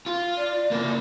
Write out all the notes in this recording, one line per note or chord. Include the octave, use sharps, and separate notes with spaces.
F4
D5
C#3 A#3